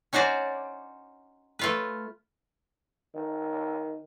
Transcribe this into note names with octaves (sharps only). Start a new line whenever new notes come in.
C#4 D#4 F#4 C5 D5
A3 F4 B4
D#3